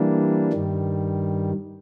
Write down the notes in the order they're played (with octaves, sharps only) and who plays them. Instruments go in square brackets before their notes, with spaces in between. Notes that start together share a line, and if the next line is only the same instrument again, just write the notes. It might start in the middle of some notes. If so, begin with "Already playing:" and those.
Already playing: [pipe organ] E3 G3 A#3 D4
G2 D#3 G3